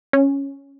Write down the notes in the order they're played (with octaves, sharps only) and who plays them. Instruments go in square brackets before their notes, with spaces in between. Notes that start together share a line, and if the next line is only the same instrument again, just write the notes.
[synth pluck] C#4